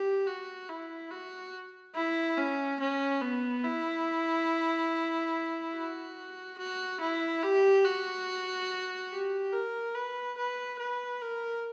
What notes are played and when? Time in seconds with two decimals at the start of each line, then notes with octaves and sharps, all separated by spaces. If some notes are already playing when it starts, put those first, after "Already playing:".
Already playing: G4
0.27 F#4
0.69 E4
1.11 F#4
1.95 E4
2.37 C#4
2.80 C#4
3.21 B3
3.64 E4
5.74 F#4
6.58 F#4
7.01 E4
7.43 G4
7.84 F#4
9.12 G4
9.53 A#4
9.95 B4
10.38 B4
10.79 B4
11.22 A#4